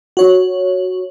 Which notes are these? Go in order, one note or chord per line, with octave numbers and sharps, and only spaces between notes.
F#4 C#5